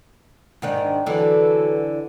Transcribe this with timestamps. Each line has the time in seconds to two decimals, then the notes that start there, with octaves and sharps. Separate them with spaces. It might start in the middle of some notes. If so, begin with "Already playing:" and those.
0.62 G#2 D#3 D4
1.06 D3 E3 F#3 D4 A4 B4